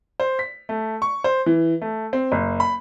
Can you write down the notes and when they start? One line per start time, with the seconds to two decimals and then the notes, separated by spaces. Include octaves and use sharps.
0.20 C5
0.39 B6
0.69 A3
1.02 C#6
1.24 C5
1.46 E3
1.81 A3
2.13 C4
2.32 F#1
2.60 B5